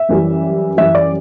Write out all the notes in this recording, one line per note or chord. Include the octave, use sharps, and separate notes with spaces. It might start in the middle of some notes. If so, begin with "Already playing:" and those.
Already playing: E5
F#2 E3 G3
F#2 E3 G3 E5
D5